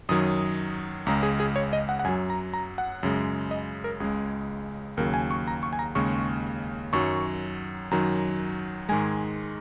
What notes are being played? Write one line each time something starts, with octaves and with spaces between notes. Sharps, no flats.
F#2 D#3 F#3 D#6
C#2 C#3 G#3 A#5
G#4
G#4
C#5
D#5
F#5
F#5
F#2 F#3 G#5
A#5
A#5
F#5
F#2 C#3 G#3
D#5
A#4
C#2 C#3 G#3 G#4
D#2 C#3 F#3 A#4
G#5
C#6
A#5
C#6
G#5
A#5
D#2 C#3 G#3 C#6
F#2 D#3 F#3 C#6
F#2 D#3 F#3 A#5
G#2 D#3 G#3 G#5